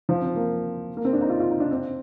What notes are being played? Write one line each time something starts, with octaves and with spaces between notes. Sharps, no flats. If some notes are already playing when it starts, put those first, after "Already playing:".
F3
C4
A#3
A#3
C4
D4
D#4
F4
F4
D#4
D4
C4